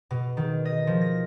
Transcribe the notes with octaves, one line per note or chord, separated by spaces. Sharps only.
B2
D#3
D#5
F3
A#6